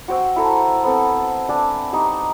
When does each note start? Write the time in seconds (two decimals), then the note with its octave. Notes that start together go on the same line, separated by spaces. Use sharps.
0.08 F#4 C5 G5 E6
0.36 E4 A4 A#5
0.83 B3 C4 A4
1.49 D4 D5 G5 G#5
1.93 D#4 G4